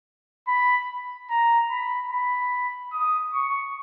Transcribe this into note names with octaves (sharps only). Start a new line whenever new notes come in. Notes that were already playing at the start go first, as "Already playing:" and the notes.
B5
A#5
B5
B5
D#6
C#6